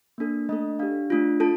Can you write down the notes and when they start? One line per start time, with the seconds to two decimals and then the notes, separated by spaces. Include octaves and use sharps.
0.18 A#3 D4 A4
0.49 A3 D4 A4 D#5
0.79 D4 G4 F5
1.10 A3 D4 F4
1.40 F4 A4 A5